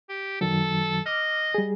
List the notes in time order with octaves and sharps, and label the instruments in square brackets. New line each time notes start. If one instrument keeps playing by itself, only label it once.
[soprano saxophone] G4
[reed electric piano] F#2 D#3 F#3 [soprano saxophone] A4
[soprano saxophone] D#5 [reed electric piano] D6 F6
[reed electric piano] G3 G#4